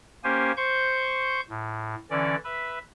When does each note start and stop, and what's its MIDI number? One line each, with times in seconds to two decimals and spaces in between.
0.24 0.52 58
0.24 0.52 61
0.24 0.52 67
0.24 0.52 72
0.24 0.52 80
0.57 1.41 72
0.57 1.41 85
0.57 1.41 91
1.50 1.95 45
2.11 2.36 50
2.11 2.36 52
2.11 2.36 61
2.11 2.36 74
2.44 2.79 71
2.44 2.79 76